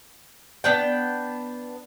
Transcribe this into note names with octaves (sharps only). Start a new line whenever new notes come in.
B3 D4 G5